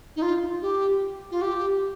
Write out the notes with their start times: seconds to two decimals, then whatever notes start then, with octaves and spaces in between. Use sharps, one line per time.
0.16 D#4
0.22 F4
0.61 G4
1.31 F4
1.41 G4